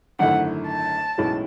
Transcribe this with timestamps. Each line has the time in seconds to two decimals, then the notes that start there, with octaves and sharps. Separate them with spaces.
0.19 G#1 F#2 D3 A3 E4 F#5
0.68 A5
1.18 B1 A2 E3 G#3 C#4